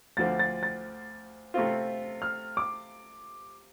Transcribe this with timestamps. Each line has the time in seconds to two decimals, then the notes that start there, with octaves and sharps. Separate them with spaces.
0.17 D2 D3 F3 C4 A6
0.39 A6
0.63 A6
1.54 C3 A3 C4 F4
2.22 F6
2.57 D6